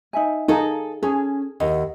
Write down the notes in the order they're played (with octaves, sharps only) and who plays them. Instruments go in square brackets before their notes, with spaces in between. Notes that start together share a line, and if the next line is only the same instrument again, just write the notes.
[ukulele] D#4 E5 G#5
[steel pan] D#4 [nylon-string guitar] G#4 A4 [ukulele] F5
[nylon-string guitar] C#4 [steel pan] G#4 [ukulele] A4
[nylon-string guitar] D#2 [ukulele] E4 D#5 F#5